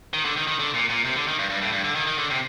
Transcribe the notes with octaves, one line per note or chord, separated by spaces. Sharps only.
D#3
D3
D#3
D#3
D3
A#2
A#2
C3
D3
D#3
G2
G2
A2
G2
D3
D#3
D#3
D3
C3